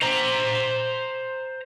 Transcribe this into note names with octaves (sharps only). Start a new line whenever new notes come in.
C5 A#5